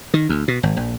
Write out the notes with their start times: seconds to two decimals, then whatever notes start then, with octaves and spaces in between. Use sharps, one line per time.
0.14 D#3
0.29 D2
0.48 B2
0.63 G#1
0.77 A#1